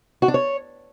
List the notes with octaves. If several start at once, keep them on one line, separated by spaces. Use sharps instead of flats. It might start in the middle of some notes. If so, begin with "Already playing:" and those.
F#4
D4
C#5